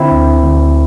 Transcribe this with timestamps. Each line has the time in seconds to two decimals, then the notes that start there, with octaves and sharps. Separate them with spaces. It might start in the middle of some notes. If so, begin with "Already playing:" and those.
Already playing: D3 C4 E4
0.12 D2
0.43 D2